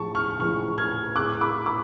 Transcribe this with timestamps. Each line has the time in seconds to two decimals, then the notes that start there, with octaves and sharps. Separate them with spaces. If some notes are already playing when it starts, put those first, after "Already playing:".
Already playing: A2 F3 G#3 A5 C#6
0.15 C#6 F6
0.39 A2 F3 G#3 C#6 F6
0.78 F6 G#6
1.16 A2 G#3 D6 F#6
1.41 B5 D6
1.66 B5 D6